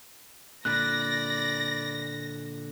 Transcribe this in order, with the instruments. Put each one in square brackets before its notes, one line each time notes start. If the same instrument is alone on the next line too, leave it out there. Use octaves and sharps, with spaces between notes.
[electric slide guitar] A#2 D3 [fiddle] D5 B5 [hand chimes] F#6 [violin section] A#6